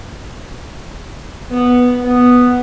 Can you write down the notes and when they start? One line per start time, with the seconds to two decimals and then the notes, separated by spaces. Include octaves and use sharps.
1.50 B3
2.04 B3